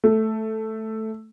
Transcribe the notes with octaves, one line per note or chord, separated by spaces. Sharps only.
A3